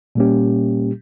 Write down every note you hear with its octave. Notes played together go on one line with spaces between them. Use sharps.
A#2 G3 A#3 C#4 G4